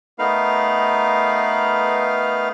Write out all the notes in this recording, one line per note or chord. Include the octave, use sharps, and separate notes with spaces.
A3 B3 D#4 A#4 B4 F5